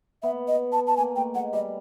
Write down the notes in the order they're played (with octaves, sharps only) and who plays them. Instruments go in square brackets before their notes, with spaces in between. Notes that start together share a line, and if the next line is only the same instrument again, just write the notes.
[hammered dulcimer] B3 [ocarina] E5
[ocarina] D#5
A5
A5
[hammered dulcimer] A#3 [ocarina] G#5
[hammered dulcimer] A3 [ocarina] G5
[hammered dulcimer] G#3 [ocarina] F#5
[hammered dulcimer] G3 [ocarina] D#5